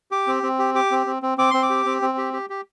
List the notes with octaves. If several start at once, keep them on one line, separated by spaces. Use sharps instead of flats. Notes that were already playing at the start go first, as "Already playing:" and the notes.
G4 D6
C4
C4
G4
G4 D6
C4
C4
C4
C4 D6
C4 C6
D6
G4
C4
C4
G4
G4
G4